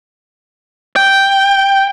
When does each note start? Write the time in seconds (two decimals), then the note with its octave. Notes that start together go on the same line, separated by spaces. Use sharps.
0.96 G5